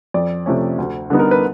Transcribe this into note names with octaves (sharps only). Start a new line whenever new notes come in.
F2 D5
C3 F3 A3 C#4
D2
D3 G3 B3 D#4
A#4
B4